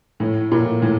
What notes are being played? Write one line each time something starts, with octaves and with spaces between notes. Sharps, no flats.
A2
A#2
A2